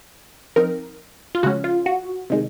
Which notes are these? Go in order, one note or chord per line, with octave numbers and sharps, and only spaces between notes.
F3 C4 D#4 A#4
F4
C#3 F3 G#3 C#4 F#4
F4
F#4
C3 D#3 G#3